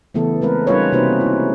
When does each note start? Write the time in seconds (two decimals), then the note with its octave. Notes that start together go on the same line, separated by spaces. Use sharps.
0.14 C#3 E3 A3 B3 A4
0.41 G#3 A3 C4 A#4 B4
0.67 G3 C#4 D#4 F4 B4 C#5
0.92 C3 A#3 D#4 F#4 B4 C5
1.21 E4